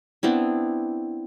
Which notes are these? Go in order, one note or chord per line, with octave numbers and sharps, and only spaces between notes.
B3 C4 D4 E4